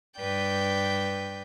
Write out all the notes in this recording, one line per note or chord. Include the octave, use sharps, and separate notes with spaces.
G2 B4 D5 G5 G6